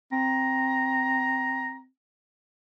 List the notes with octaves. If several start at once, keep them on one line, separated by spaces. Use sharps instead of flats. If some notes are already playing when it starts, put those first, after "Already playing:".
C4 A#5